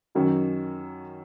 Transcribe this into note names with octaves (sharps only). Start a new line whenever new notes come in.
F#2 D#3 F#3 C#4